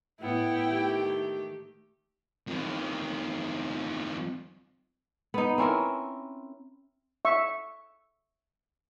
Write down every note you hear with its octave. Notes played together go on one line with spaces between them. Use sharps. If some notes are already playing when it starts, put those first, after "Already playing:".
A2 B3 E4 G5
D#3 A3 G4
F2 D#3
B3 D#4
C4 C#4 E4 A#4
E5 C#6